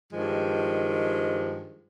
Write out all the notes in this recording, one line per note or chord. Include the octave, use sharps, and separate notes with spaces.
G2 D#3 F3 G#3